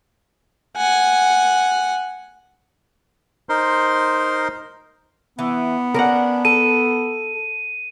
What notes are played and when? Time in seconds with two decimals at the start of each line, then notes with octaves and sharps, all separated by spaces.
0.76 F#5 G#5
3.49 D#4 A#4 C5 C6
5.39 E3 B3
5.94 C#4 D4 A#4 F#5
6.45 A4 D#7